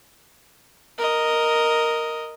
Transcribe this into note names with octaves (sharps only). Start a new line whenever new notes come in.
A#4 D#5